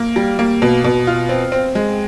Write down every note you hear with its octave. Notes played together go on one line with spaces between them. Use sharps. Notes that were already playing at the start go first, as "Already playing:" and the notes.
Already playing: A#3
G3
A#3
B2
B2
F4
C4
C4
G#3